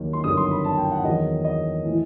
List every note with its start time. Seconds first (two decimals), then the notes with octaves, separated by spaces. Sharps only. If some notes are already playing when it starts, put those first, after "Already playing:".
Already playing: D#2 D#3 F#3
0.13 C6
0.24 G1 F#2 D#3 F#3 D#6
0.37 C6
0.51 B5
0.64 A5
0.77 G5
0.91 F#5
1.04 E2 D#3 F#3 D#5
1.44 D#5
1.85 A2 E3